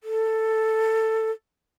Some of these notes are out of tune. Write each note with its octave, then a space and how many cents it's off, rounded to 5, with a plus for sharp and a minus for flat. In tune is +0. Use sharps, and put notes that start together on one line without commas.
A4 +10